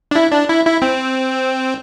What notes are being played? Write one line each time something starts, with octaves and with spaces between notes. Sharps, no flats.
D4
E4
D4
E4
E4
C4